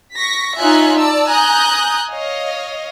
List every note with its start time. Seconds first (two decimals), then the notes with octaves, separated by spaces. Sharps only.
0.14 C#6 A#6 B6
0.58 D#4 F4 C#5 E5 G#5 F#6
0.99 D5 A5 E6
1.29 G#5 A#5 D#6 F#6 G6
2.10 C#5 D#5 F5